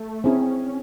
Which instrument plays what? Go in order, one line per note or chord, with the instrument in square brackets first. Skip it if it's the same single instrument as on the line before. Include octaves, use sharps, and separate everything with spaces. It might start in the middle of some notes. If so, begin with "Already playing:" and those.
Already playing: [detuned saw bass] A3
[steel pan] C4 E4 G#4 [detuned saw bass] C#4